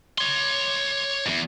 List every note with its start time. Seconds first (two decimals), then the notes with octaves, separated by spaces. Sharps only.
0.18 C#5 C6
1.26 E2 G#2